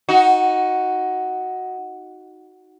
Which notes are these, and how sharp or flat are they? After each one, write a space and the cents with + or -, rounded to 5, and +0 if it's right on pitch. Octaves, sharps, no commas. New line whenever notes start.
D#4 +15 F#4 +0